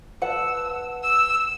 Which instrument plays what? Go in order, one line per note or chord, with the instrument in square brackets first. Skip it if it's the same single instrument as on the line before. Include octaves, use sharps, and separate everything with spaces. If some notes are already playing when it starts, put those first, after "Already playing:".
[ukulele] B4 F#5 A5 [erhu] E6
[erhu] E6